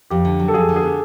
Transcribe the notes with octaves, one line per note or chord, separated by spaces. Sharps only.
F2 G4
D3
F#3
A4
F2 G#4
D3
G#4
B3